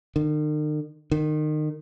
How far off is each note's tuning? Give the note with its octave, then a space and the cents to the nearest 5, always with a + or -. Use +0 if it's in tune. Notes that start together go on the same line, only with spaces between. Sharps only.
D#3 -45
D#3 -30